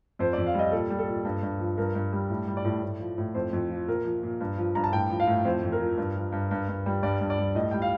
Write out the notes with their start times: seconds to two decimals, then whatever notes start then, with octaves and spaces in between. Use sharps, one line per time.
0.19 F2 C5
0.33 F2 D5
0.46 F5
0.55 G3 D#5
0.72 A#2 A4
0.90 G3
0.99 A4
1.08 A#2
1.25 G2
1.43 G2
1.59 F3
1.78 G2 A#4
1.95 G2
2.13 G3
2.30 A2
2.48 G3
2.57 D5
2.65 A2
2.83 A2
3.00 F3
3.18 A2
3.35 F2 C5
3.53 F2
3.70 F3
3.87 A#2 A#4
4.05 F3
4.23 A#2
4.41 G2
4.58 F3
4.75 G2 A#5
4.84 A5
4.92 A2 G5
5.10 F3
5.20 F5
5.27 A2
5.45 F2 C5
5.63 F2
5.72 A#4
5.80 F3
5.98 G2
6.15 F3
6.32 G2
6.51 G2
6.69 G2
6.86 G3
7.03 G2 D5
7.21 G2
7.30 D5
7.38 G3
7.55 A2 D#5
7.71 G3 G5
7.82 F5